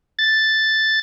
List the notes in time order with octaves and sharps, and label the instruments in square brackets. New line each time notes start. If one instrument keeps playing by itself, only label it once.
[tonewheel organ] A6